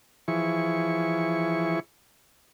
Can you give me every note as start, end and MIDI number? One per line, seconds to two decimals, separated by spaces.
0.28 1.80 52
0.28 1.80 53
0.28 1.80 64
0.28 1.80 68
0.28 1.80 85